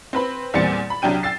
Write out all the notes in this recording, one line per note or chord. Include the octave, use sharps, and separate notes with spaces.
C4 B4 B5
E2 A#2 G3 C4 A6 C#7
B5
C2 F#3 D4 G5 D#7
G5 E6 A6 C7